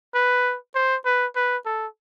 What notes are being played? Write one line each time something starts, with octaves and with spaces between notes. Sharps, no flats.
B4
C5
B4
B4
A4